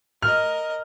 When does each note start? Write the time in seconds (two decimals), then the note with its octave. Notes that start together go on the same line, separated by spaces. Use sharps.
0.22 A#4 D#5 F6